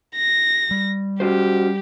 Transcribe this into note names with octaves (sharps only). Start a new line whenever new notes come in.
A#6
G3
C#4 F#4 G4 C5